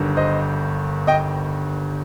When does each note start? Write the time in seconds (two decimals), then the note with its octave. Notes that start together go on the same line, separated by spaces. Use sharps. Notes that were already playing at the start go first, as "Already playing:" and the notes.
Already playing: G1 G2 D#3
0.17 C5 D#5
1.07 D#5 G5